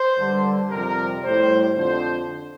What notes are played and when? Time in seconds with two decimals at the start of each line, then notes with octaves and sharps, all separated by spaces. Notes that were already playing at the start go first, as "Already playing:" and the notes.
Already playing: C5
0.17 G2 D3 G3
0.70 F2 C3 G3 A#4
1.23 A2 G3 C5
1.76 F2 D3 F3 C5